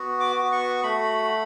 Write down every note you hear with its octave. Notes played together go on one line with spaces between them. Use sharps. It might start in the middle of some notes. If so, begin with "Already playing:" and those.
Already playing: B3 F#4
D6
F#4
C#6
A3 B5